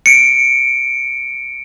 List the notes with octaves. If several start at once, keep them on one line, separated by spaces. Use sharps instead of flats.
C#7 D7